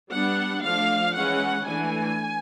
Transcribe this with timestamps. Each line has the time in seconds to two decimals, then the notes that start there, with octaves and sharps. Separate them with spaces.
0.12 G3 B3 D4 F#5
0.63 F3 A3 D4 F5
1.14 E3 G#3 C#4 F#5
1.66 E3 A3 D4 G#5